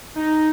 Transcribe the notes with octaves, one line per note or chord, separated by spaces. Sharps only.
D#4